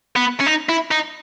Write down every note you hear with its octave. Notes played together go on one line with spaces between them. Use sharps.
B3
C#4
D#4
E4
D#4